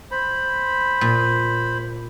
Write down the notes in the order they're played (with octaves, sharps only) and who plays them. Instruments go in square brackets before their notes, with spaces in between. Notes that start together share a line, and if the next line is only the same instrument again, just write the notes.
[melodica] C5 B5
[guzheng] A#2